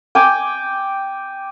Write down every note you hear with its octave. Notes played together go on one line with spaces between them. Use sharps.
G5 G#5 D6